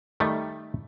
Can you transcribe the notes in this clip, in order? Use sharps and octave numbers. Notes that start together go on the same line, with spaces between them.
D#3 G3 A3